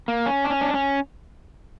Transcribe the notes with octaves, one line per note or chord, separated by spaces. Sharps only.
A#3
C#4
D4
C#4
D4
C#4